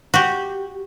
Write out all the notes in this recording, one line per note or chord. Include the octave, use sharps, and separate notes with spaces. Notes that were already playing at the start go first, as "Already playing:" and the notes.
F#4 G4